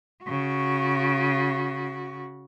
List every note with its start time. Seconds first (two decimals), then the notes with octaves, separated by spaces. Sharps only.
0.24 C#3 F#4